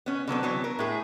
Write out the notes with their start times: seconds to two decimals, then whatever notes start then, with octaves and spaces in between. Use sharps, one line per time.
0.06 B3 C#4
0.28 D3 F#3 B3 C4
0.43 E3 F#3 B3
0.64 A#4
0.79 A2 G#4